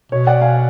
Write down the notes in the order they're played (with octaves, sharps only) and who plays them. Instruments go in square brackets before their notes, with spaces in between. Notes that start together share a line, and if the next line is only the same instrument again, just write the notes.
[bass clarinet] B2 [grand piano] C#5
[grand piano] D5 F#5
F5 G#5